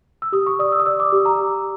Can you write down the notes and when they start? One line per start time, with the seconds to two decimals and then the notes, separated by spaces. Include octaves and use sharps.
0.22 E6
0.32 G4 D#6
0.47 C#6
0.59 D5 D#6
0.72 E6
0.80 D#6
0.86 D5 E6
1.00 D6
1.12 G4
1.26 A#5
1.39 G4